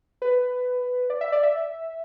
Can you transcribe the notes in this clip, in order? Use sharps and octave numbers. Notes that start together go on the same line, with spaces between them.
B4
D5
E5
D5
E5